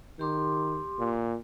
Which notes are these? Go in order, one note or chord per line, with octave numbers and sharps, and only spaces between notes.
D#3 G4 C6 D6
A#2